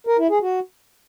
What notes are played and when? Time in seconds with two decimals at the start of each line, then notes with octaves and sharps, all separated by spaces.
0.07 A#4
0.18 E4
0.30 G#4
0.42 F#4